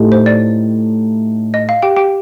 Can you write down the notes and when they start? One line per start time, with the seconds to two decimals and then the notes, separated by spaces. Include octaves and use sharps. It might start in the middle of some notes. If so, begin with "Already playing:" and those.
Already playing: A2 A3 D#4 G4
0.12 C5
0.26 D5
1.54 D#5
1.69 F5
1.82 G4 G5
1.96 G4 G5